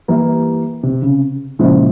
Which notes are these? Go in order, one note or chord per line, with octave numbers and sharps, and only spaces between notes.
E3 G3 A#3 E4 G4
C3
C#3
A#2 C#3 F3 G#3 E4